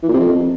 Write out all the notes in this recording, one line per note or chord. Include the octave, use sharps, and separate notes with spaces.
E3
A#2
C3
F2